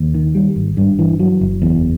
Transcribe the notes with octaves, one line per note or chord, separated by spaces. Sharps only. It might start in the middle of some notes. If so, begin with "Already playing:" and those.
Already playing: D#2
D#3
G3
G#1
G2
E3
F#3
F#1
E2